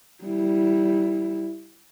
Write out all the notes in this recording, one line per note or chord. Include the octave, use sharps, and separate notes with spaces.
G3 E4